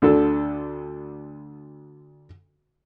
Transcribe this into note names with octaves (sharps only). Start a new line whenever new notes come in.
D2 D3 D4 A4